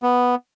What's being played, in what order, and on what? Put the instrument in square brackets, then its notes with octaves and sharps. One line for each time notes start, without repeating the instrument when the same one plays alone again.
[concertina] B3